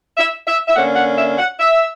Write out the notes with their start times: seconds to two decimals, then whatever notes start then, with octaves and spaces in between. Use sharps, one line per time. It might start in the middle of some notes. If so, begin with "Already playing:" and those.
0.17 E5
0.47 E5
0.67 E5
0.75 D3 A#3 C#4 F#5
0.96 F#5
1.18 E5
1.38 F#5
1.59 E5